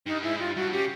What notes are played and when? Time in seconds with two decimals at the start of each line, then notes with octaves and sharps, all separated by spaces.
0.06 G2 D#4
0.23 G#2 E4
0.39 G2 F4
0.56 G2 F#4
0.72 C#3 G4